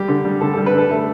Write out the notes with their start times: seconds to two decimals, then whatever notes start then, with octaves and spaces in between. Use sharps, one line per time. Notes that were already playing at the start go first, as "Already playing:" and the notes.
Already playing: G3 G4
0.08 D3
0.25 G3
0.41 D3 A4
0.53 A4
0.57 G3
0.66 B4
0.73 D3 A4
0.91 A3